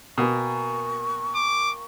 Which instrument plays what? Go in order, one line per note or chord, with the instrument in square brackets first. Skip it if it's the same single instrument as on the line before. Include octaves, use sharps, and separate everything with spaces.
[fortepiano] B2 [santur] A#3 G5 G#5 [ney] C#6
[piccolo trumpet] D6